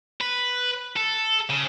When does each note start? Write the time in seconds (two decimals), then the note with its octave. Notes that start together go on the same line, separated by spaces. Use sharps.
0.21 B4
0.97 A4
1.50 C#3